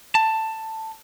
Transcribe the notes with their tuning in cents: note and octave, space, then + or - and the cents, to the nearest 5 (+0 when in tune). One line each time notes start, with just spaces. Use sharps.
A5 +10